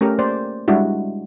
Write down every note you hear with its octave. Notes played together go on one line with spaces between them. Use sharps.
A3 C#4 G4 A#4
A#3 C5 D5
G3 G#3 D4 E4 F#4